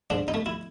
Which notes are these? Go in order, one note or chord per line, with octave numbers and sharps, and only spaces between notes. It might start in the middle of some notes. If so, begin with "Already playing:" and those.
G#2 D4
D#4
A3
E4